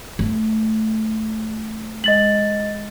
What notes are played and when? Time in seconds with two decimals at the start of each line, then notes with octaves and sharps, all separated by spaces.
0.19 A3
2.04 G#3 D#5 A6 F#7